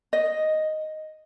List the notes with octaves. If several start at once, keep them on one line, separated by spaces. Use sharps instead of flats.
D#5